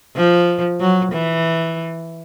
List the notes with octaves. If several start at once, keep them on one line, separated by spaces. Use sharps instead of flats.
F3
F#3
E3